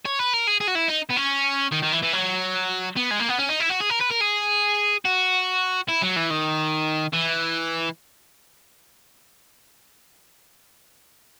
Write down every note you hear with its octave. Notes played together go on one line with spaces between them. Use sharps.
C#5
B4
A#4
G#4
G#4
F#4
E4
D#4
B3
C#4
D#3
D#3
E3
E3
F#3
B3
G#3
A#3
B3
C#4
D#4
E4
F#4
G#4
A#4
B4
A#4
G#4
F#4
E4
F#3
E3
D#3
E3